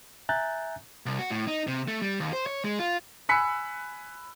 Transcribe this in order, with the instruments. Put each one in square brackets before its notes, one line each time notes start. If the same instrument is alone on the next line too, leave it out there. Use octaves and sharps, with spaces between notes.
[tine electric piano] E5 G#5 A#5 F#6 G6 A6
[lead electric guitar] C2
F#4
A2
D#4
C3
A3
G3
D#2
C5
C#5
G#3
F4
[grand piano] G#5 B5 E6 F#6 B6 C#7